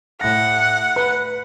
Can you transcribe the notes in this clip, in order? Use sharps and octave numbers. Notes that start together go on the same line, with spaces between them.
A2 F#5 A#6
B4